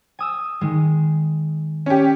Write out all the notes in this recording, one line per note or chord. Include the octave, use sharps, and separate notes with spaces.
G#5 D#6 E6
D#3 G#3
C#4 G4